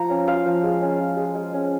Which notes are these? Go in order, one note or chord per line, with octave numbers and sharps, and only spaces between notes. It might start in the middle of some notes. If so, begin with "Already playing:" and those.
Already playing: F3 F4 A#5
C#4
F4 F5
F3
G#3
C#4
F4
G#3
G#3
C#4